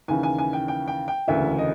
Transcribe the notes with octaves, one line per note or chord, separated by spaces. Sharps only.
D#2 C#3 E3 G#5
G#5
G#5
G5
G5
G5
G5
E1 D2 C#3 E3 E5
D#5